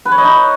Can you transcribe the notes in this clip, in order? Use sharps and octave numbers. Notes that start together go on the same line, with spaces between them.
B4
C#5
D#5
D#4